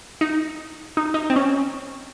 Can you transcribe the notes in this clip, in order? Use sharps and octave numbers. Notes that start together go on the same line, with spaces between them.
D#4
D#4
D#4
C4
C#4